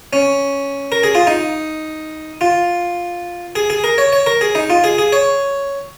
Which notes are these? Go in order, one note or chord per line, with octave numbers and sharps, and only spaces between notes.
C#4
A#4
G#4
F4
D#4
F4
G#4
G#4
A#4
C#5
C#5
A#4
G#4
D#4
F4
G#4
G#4
C#5